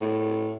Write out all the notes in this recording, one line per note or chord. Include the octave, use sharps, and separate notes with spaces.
A2